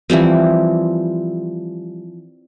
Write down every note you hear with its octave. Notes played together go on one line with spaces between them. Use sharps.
E3 F3 G3 C4